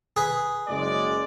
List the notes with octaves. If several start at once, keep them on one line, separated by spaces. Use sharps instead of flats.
G#4 B4
F#1 G#3 D5